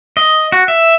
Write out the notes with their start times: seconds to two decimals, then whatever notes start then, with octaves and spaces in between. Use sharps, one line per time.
0.17 D#5
0.52 F#4
0.68 E5